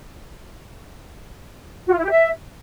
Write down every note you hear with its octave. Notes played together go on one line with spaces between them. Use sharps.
F#4
F4
E4
G4
E5